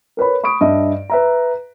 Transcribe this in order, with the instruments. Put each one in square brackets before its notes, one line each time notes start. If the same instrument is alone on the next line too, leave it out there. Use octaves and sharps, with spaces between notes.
[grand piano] A#4 B4 C#5 B5
B5 C#6 D#6 D7
G2 D#5 E5
B4 E5 A#5